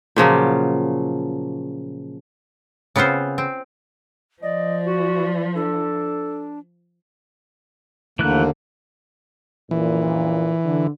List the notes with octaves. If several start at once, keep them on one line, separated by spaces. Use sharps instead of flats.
A#2 C#3 F3 F#3
C#3 B3 C4 F4 C5
C4
F3 D5 D#5
F#4
D4 A4
D#2 D3 E3 A3 A#3 F#6
A#1 F#2 A#2 E3
D3